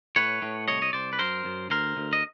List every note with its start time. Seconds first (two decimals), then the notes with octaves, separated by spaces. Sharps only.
0.16 A2 B4 C#5
0.42 A2
0.68 C2 C#5 D#5
0.82 D#5
0.93 C2 C5 D5
1.13 B4
1.19 F#2 A#4 C5
1.45 F#2
1.70 D2 A#4 C5
1.97 D2
2.13 D#5